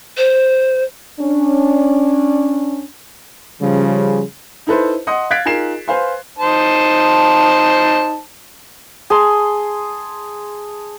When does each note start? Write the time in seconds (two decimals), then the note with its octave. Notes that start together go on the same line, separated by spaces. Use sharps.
0.18 C5
1.20 C#4 D4
3.62 C#3 F3 G3
4.67 D#4 E4 A4 B4 C5
5.07 D#5 F#5 C6 D#6
5.31 F5 F#6 G#6 A6 B6 D7
5.45 D#4 F4 G#4 A#4 C7 E7
5.88 B4 C5 F5 G#5 C6
6.39 D#4 C5 A5
9.10 G#4 A5 C6